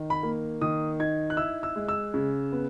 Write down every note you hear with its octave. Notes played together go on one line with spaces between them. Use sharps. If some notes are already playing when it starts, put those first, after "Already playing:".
Already playing: D#3
B5
A#3
D#3 D#6
D#4 G#6
F#6
E4 E6
E6
G#3
E6
C#3
B3